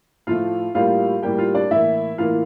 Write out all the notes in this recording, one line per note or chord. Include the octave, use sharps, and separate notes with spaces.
A2 F3 A3 F4 F5
A2 G3 A#3 F4 F5
A2 G3 A#3 G4 G5
F4 F5
D4 D5
A2 E3 A#3 E4 E5
A2 E3 A#3 F4 F5